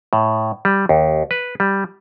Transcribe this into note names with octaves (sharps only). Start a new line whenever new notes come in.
A2
G3
D#2
B4
G3